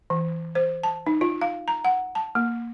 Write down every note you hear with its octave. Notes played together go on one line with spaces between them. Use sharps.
E3
C5
A5
D#4
F4
F5
A#5
F#5
A5
A#3